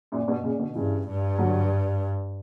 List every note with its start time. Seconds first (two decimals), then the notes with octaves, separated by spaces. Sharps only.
0.12 F#2 A#2
0.28 G2 B2
0.44 A#2 C#3
0.59 B2 D3
0.75 G2 C#3 E3
1.07 G2
1.39 D3 F#3